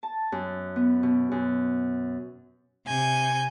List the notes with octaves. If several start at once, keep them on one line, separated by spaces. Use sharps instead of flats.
A5
F#2
B3
B2
F#2
C3 G#5 G6